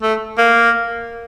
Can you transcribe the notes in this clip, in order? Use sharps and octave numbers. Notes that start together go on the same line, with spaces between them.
A3
A#3